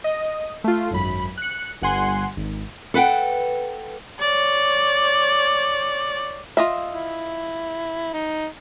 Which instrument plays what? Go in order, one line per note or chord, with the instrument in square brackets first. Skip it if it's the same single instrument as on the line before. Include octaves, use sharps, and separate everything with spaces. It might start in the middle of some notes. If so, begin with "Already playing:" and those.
[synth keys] D#5
A3 F4
G#1 F#2 B5
F#6 C#7
G1 G2 F#5 G#5 C6
G#1
[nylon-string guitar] A4 B4 F#5 G5
[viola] C#5 D5
[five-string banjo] F4 D#5 E5
[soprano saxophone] E4
D#4